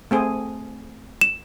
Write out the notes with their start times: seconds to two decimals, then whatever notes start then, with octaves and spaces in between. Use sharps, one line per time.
0.11 A3 C4 G#4
1.21 E7